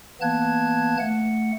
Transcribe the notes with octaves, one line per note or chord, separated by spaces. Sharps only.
E3 A#3 B3 A5 F#6 G#6
A3 F#5